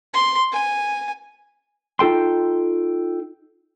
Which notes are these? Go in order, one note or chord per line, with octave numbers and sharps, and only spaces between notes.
C6
G#5
D#4 F4 A4 G5 C6